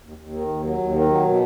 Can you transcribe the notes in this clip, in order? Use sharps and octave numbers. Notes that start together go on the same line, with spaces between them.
D#2
D#2
D#3
D#2
F#3
D#2
D#3
F#3
B2